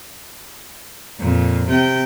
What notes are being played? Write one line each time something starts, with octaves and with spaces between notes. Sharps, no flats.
F2 A#2
C3 G5